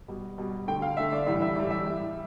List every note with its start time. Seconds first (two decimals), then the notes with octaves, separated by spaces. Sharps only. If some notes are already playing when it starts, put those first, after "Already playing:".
0.08 B2 G3
0.38 B2 G3
0.67 D3 A3 G5
0.82 F5
0.97 D3 A3 E5
1.12 D5
1.26 A2 E3 G3 E5
1.42 E5
1.56 A2 E3 G3 D5
1.71 E5
1.85 A2 G3